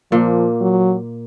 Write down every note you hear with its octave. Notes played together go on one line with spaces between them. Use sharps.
A#2 F3 A#3
F#3